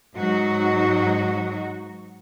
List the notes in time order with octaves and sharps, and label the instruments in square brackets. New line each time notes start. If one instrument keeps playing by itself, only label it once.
[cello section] G#2 F#3 D#4 F#4